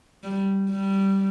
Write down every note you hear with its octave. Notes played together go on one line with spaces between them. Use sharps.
G3
G3